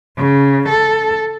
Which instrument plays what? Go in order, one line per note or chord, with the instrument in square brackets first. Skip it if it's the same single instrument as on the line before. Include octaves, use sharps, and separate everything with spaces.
[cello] C#3
A4